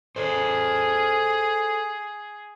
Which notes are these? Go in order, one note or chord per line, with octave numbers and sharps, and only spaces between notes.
G#4 A4 C5